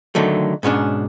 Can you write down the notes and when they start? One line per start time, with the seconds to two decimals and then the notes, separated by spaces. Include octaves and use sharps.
0.15 D3 D#3 F#3 A3
0.63 G#2 B2 C#4 D4